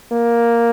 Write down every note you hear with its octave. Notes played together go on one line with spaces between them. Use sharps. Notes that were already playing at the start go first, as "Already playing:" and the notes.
A#3